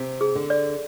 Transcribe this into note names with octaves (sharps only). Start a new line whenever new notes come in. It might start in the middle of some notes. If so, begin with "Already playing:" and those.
Already playing: C3
G#4
D3
D5